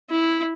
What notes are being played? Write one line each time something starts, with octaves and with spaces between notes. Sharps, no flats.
E4